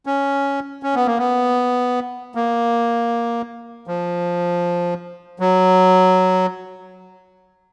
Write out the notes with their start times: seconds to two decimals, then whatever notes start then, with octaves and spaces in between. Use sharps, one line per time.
0.06 C#4
0.83 C#4
0.95 B3
1.06 A#3
1.18 B3
2.35 A#3
3.87 F3
5.40 F#3